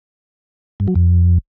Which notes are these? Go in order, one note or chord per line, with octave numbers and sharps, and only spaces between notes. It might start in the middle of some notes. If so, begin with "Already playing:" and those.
G2
F#3
F2